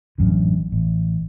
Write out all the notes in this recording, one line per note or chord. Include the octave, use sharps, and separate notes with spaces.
A1 F#2 D3
A1